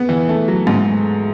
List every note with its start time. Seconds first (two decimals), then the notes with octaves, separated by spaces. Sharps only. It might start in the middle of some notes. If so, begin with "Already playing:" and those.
Already playing: C#3 B3
0.09 E3
0.29 A3
0.48 F#3
0.67 G#2